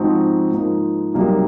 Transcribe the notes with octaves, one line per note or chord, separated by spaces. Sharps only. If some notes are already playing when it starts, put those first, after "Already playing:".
Already playing: G#2 F3 C4 D#4 F#4
G#2 F3 A#3 D#4
C2 C3 F#3 A#3 D#4